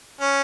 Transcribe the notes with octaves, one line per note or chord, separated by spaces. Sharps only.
C#4